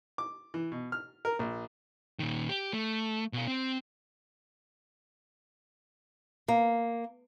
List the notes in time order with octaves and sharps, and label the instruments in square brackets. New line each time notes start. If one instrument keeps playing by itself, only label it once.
[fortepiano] D6
E3
B2
F6
A#4
A#1
[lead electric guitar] A#2 D#3
G4
A3
B2 F5
C4
[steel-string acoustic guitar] A#3